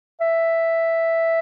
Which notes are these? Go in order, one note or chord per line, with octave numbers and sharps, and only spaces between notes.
E5